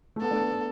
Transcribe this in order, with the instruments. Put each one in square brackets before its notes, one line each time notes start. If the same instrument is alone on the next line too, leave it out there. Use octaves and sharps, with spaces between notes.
[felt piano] A3
[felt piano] B3 [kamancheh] A4
[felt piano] A3 D4
B3
B3